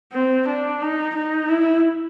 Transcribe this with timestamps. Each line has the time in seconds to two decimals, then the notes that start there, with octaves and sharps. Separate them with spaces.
0.13 C4
0.48 D4
0.82 D#4
1.15 D#4
1.49 E4